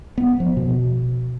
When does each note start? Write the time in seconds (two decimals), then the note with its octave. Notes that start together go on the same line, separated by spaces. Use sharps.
0.18 B3
0.40 F3
0.57 B2